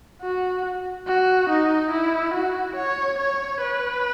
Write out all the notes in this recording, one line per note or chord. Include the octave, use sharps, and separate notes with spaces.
F#4
F#4
D#4
E4
F#4
C#5
C#5
B4